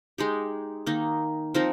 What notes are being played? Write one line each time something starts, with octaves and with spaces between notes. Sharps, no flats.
G#3 D#4 G4
D#3 A#3 D#4
F3 C4 D#4 A#4